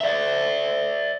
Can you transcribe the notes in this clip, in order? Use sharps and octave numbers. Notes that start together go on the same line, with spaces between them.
D5 E5